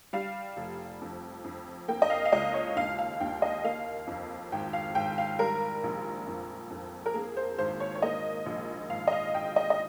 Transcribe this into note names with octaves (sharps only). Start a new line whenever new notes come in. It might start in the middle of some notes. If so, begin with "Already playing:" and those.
G3 F5
F1
F2
F2
A#3 G5
D#5
F5
F5
C#2 D#5
C#5
D#2 F5
F5
D#2 G5
D#5
A#3 F5
F2
G#1 G5
F5
G#1 G5
F5
G3 A#4
A#1
F2
F2
A#4
A#3 G#4
C5
G#1 C5
C#5
C#5
A#3 D#5
A#1
G#1 F5
D#5
F5
G#1 G5
D#5
D#5